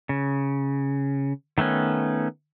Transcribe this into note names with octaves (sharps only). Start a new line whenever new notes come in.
C#3
D#3 A3 B3 C#4